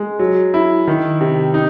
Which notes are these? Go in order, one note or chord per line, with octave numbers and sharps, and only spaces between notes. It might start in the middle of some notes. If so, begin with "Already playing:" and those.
Already playing: G#3
F#3
E4
D#3
C3
D#4